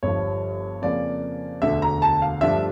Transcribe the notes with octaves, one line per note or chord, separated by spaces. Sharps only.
G1 G2 F3 C#5
F2 C#3 F3 A#3 C#4 D5
E1 D2 D3 E5
A#5
A5
F5
G2 F3 A3 D4 F4 E5